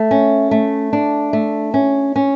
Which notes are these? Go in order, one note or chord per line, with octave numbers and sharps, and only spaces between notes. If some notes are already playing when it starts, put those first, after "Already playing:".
Already playing: A3
C#4
A3
D4
A3
C#4
C#4